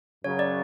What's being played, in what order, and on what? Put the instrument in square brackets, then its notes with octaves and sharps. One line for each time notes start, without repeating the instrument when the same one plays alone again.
[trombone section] F#2 C#3 F#3 [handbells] C#5
[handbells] D5